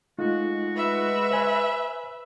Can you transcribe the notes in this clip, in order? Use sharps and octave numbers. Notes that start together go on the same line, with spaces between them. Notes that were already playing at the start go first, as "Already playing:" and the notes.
G#3 A3 D#4 F4 F#4
B4 E5
C5 G#5